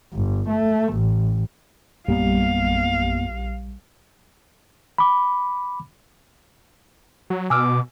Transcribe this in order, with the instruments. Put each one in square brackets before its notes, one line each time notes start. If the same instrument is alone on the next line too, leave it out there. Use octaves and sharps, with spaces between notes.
[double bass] G1
A3
A1
[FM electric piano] A#1 G3 [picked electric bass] F#2 A#3 B3 [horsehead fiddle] F5
[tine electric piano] B5 D6
[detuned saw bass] F#3
[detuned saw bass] B2 [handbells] G#5 E6 F6 [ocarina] D6